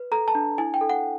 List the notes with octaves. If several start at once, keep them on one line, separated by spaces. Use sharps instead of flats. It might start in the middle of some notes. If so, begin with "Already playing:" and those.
Already playing: B4
A4 A#5
A5
D4
E4 G#5
G5
A4
F#5